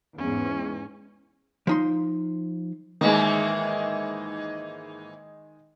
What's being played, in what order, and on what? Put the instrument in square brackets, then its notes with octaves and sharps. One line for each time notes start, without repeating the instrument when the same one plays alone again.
[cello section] E2 G#2 [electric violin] C#4
[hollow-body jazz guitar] F3 D#4 C6
[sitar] G#2 E3 A#3 [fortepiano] D#3 G#3